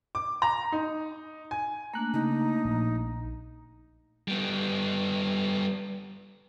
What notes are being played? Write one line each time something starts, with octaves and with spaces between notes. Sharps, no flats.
D6
A#5
D#4
G#5
A3 A#3 D4 A#5 F#6
C#3 D#4
A#1
G3 B3